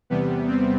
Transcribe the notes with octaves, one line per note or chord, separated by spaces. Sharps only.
E2 C3 G3 B3
C4